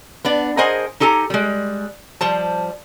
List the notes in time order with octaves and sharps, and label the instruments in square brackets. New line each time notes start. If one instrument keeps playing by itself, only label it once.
[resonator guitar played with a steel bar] B3 D4 D5
G#4 A#4 C5 D#5 F#5 G#5
D#4 G4 A4 G#5 A#5
G3 G#3
F3 G3 C5 A5